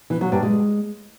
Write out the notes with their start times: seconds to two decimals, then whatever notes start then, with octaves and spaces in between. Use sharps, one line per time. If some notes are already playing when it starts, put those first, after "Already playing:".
0.10 E3
0.21 F#3
0.32 G2
0.43 G#3